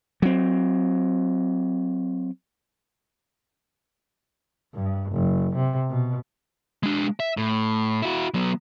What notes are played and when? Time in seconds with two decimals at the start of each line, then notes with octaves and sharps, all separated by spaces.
0.22 F#3 C4
4.75 G2
5.12 F#1
5.56 C3
5.90 B2
6.83 G#3 D4
7.20 E5
7.37 A2
8.02 E4 F#4
8.34 F#3 B3